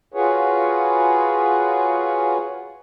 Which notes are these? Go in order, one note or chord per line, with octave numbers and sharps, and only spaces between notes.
F4 F#4 G#4 B4 C#5